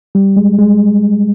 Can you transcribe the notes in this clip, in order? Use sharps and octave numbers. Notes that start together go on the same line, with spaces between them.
G3
G#3
G#3